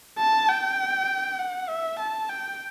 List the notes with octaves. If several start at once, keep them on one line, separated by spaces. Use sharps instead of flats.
A5
G5
F#5
E5
A5
G5